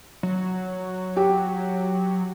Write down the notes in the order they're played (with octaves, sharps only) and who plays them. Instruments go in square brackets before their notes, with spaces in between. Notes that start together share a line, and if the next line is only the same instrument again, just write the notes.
[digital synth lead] F#3
[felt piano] G4